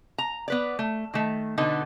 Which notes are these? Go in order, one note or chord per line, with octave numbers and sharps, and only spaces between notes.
A#5
B3 B4 D5
A3
D#3 A3
B2 D3 B3 D#4 A4